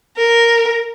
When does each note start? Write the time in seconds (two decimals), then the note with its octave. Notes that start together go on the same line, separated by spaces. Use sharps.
0.17 A#4